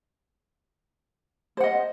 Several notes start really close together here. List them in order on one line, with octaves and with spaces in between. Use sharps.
C5 F#5 D#5